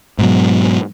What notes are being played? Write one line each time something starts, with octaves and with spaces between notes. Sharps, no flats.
G#2 B2 F#3